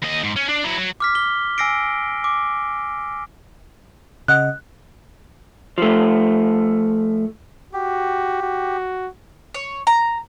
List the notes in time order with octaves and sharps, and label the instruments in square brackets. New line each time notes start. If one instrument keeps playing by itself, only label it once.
[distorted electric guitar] D#2 D#5
G#2
C#4
D4
F#3 E4
F#3
[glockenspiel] D6 F6 B6
G7
G#5 E6 A#6 C7 D7
D6
[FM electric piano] C#3 D#5 F#5 [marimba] F#6
[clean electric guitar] F3 A3
[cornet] F#4 [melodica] G4
[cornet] F#4
[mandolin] C#5
A#5